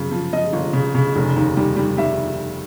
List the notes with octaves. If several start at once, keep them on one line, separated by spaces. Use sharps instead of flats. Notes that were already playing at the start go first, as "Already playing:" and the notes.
Already playing: F#2 C#3 F3
F3
F3 D#5
G1
C#3
C#3
F1
D#2
G3
G3
G3 E5